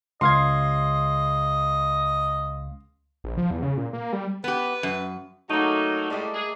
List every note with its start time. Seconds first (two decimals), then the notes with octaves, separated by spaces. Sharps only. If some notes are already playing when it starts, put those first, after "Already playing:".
0.21 C#2 D#5 F5 C6 G#6
3.24 A#1
3.37 F3
3.51 E2
3.62 C#3
3.77 A#2
3.93 A#3
4.13 G3
4.44 B3 G4 B4
4.83 F#2
5.49 F#3 A3 A#3 D#4
6.10 A2 G3 G#3 D5 D#5
6.33 G#4